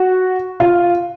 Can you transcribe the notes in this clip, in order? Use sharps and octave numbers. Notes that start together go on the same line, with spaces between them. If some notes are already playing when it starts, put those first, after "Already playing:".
Already playing: F#4
F4